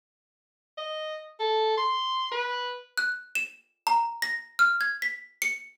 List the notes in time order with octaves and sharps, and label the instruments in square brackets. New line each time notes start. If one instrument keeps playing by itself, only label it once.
[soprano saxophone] D#5
A4
C6
B4
[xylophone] F#6
E7
A#5
A#6
F6
G#6
B6
C#7